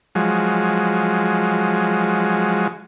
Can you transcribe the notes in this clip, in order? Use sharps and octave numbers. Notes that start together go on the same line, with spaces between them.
F3 F#3 G#3